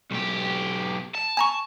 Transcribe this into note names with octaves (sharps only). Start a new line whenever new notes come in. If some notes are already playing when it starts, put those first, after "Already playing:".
B1 G4
A5
G#5 A#5 C#6